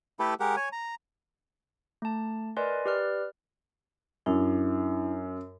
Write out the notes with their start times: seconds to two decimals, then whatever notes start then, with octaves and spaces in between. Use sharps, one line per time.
0.19 A3 E4 G4 A4 B4
0.40 G#3 G4 A#4 F#5
0.56 C#5 G#5
0.72 A#5
2.02 A3 A5
2.57 A#4 B4 D5 D#5 G#5 C6
2.86 G4 B4 D5 F6
4.26 F#2 D4 E4